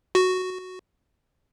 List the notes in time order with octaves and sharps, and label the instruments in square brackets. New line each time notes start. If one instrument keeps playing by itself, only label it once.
[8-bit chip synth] F#4